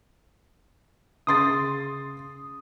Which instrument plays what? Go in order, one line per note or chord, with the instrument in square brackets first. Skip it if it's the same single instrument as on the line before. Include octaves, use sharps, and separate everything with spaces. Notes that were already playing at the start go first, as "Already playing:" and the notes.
[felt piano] C#3 C6 A6 [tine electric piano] D#6